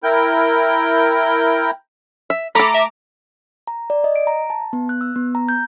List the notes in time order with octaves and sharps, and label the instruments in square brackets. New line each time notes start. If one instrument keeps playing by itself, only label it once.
[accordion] E4 A#4 G5 G6
[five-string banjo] E5
[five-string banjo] A3 A4 [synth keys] A#5 D6 [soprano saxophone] B5
[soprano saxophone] E5
[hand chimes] A#5
D5
D#5
D7
A#5
A5
B3
F#6
E6
B3
A#5
G6